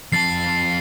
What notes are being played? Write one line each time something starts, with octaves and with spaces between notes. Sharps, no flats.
F2 A5 A6 C7